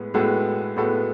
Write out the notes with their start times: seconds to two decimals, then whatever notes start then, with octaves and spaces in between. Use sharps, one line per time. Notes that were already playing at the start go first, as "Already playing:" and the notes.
Already playing: A2 G#3 B3
0.14 A2 G#3 B3 F#4 A4
0.77 A2 G#3 B3 F#4 A4